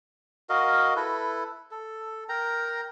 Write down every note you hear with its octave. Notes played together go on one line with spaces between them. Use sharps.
F#4 A#4 D#5 F5
E4 A4 B4
A4
A#4 G5 A#5